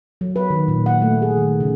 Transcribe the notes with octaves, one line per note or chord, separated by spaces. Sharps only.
F#3
B4
D#3
A#2
F#5
A3
G#4
D#3
C#3